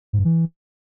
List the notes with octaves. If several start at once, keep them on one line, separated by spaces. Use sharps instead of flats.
G#2
G2
E3